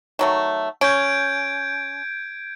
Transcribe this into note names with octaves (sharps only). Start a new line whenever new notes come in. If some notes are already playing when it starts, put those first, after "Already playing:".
D#3 F#3 A3
C#4 G6 G#6 D7